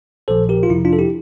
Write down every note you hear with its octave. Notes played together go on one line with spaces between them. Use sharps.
A#1 A#2 F3 A4 C5
G4 A#4
F4
F2 C3 F3 E4
D4 F4
A4
E4 G4